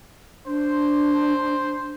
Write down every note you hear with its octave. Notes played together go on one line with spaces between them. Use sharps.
D4 C5